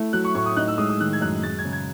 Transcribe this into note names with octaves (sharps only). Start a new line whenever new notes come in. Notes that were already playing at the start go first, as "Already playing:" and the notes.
Already playing: A3 E4
F#3 F#6
C#6
A2 C#6
D#6
D#4 F#6
E6
G#3 D#6
D#6
D#3 F#6
G#6
F#2 F#6
G#3 A6
G#6
C#3
G#6